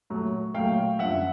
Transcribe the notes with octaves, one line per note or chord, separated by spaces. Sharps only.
A#2 F#3 A3
A#2 F#3 A3 F5 G5
F#2 D3 F3 E5 F#5